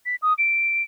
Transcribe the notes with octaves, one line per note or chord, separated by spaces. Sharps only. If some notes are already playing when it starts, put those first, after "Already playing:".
B6
D#6
D7